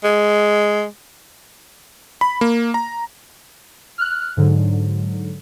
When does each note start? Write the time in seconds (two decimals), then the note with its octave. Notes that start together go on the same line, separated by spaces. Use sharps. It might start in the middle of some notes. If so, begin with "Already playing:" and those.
0.03 G#3
2.21 B5
2.41 A#3
2.74 A#5
3.98 F6 F#6
4.37 G#2 D3 F#3